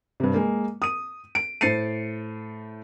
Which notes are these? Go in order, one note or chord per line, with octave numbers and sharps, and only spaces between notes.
G2 C3
G#3 A#3
D#6 D#7
D7
A2 C5 A6 C7 C#7 D#7